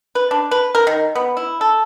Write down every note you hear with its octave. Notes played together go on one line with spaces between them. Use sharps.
B4
D4
B4
A#4
D#3
B3
E4
A4